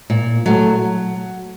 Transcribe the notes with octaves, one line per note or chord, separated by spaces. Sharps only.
A#2
F#3 A3